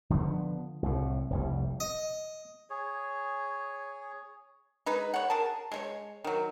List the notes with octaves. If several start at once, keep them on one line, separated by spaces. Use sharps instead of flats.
D3 F3 A3 B3
C2 A2
F1 C2 G3
D#5
G#4 C#5
G#3 D#4 B4
C#5 F#5
G#4 A#4 A5
G#3 A3 C#5
D#3 F#3